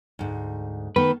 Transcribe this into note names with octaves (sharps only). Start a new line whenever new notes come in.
D2 G#2
D#3 A3 B3 B4